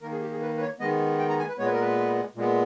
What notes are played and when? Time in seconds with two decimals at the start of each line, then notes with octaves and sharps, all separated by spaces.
0.02 D#3 A#3 A#4
0.12 G#4
0.22 G4
0.31 G#4
0.41 B4
0.57 B4
0.61 C#5
0.80 D#3 G#3 B3 D#5
1.19 G5
1.29 A#5
1.39 G#5
1.48 B4
1.59 A#2 G#3 B3 C#5
1.66 B4
1.73 A#4
1.81 B4
2.36 A#2 G#3 B3